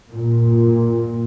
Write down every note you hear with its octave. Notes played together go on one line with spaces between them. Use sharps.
A#2